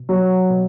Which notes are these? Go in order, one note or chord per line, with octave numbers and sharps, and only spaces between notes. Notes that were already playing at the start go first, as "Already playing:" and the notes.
Already playing: B2
F#3
B2